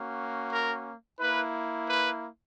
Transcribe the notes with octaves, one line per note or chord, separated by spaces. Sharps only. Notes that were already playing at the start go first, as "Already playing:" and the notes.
Already playing: A#3 C#4 F#4
A#4
A#3 E4 B4
B4